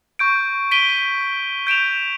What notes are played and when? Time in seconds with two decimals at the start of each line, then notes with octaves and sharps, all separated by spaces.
0.19 C#6 G6 D7
0.71 B6 D7 D#7 G7
1.67 G6 D7 E7 F7